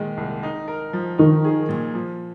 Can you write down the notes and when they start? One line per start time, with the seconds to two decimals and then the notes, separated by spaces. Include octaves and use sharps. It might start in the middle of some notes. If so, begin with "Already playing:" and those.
Already playing: A#2 D#3 G#3
0.17 C2
0.43 D#4
0.68 A#4
0.93 F3
1.18 D#3 D#4
1.44 G#4
1.69 A#2
1.95 F3